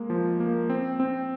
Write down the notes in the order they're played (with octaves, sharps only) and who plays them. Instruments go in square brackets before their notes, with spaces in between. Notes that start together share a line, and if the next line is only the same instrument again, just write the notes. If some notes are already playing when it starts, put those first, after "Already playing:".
Already playing: [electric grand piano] G#3 A#3
F3
A#3
C4
C4